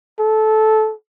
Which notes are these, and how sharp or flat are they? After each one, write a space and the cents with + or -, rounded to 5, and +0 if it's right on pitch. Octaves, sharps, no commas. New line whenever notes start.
A4 -15